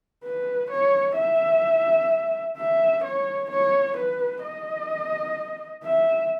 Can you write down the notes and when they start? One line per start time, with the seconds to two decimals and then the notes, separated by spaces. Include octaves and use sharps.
0.24 B4
0.71 C#5
1.17 E5
2.57 E5
3.04 C#5
3.50 C#5
3.97 B4
4.44 D#5
5.84 E5